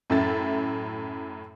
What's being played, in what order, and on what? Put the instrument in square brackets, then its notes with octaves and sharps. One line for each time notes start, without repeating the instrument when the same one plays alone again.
[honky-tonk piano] F#2 A2 E5 A6